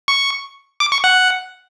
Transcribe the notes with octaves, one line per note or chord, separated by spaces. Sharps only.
C#6
D6
C#6
F#5